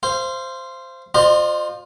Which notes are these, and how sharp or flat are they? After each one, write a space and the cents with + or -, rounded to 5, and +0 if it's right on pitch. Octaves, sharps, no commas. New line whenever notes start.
C5 +0 F5 -35
F4 +20 C5 -5 D#5 -40